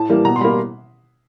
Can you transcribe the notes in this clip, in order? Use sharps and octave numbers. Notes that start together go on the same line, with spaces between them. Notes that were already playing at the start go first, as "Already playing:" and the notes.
Already playing: A2 A5
E3 G3 A#3
B2 A#5
C6
G3 A#3 B5